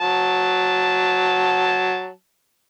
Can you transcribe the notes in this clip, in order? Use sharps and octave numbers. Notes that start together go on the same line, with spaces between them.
F#3 A5